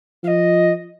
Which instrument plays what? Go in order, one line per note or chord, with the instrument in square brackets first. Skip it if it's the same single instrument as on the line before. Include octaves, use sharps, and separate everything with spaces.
[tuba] F3 [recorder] F5
[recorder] D#5